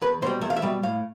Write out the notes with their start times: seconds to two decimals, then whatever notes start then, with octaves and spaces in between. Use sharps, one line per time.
0.01 E2 B4
0.22 B2 C5
0.26 G3
0.41 E2 E5
0.50 F5
0.56 E5
0.62 B2 G3
0.83 A2 F5